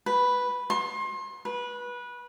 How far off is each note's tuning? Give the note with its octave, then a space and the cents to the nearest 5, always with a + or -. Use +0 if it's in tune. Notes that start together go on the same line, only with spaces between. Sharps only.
B4 +0
C6 +35
B4 -20